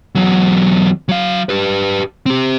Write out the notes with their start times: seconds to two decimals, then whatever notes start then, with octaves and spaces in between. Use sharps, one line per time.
0.15 E2 F#3
1.09 F#3 F5
1.49 G4 B4
2.26 C4 G4